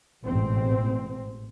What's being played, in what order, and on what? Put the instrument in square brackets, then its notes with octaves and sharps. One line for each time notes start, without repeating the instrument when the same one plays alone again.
[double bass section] A1 G#2 B2 C4